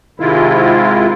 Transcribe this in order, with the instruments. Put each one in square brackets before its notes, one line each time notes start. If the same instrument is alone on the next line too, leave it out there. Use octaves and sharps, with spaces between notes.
[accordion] G#2 C3 D#3 G#3 E4 F4